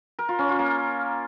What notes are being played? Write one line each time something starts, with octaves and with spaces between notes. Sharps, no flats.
A#4
F4
C#4
F4
A#3